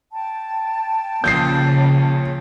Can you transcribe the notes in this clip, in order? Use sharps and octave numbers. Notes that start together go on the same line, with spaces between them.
G5 A5
A#2 C#3 F3 D#6 G6 C7